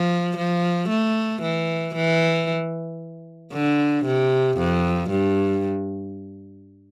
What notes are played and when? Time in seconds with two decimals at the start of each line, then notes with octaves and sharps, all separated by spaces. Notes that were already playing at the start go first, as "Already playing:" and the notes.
Already playing: F3
0.37 F3
0.90 A3
1.42 E3
1.95 E3
3.53 D3
4.05 C3
4.58 F2
5.10 G2